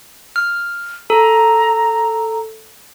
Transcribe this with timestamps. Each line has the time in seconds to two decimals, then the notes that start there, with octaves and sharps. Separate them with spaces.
0.36 F6
1.10 A4 A#5